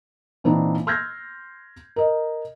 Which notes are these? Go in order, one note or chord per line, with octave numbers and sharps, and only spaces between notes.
A#2 E3 C4 D4 D#4
C6 E6 F6 G6 G#6 A#6
A#4 D#5